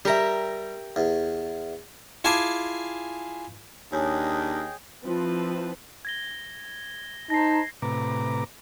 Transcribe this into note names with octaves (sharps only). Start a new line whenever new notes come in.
G3 G4 A#4 E5 A#5
E2
E4 F4 G#4 G#5 A5 D6
D#2 D4 G#4 C#5 D#5 G5 G#5
F3 C4 E4 B4 A5
G#6 A#6 G7
D#4 C5 A5 A#5 A#6 C7
A2 C3 B4 A#5 D6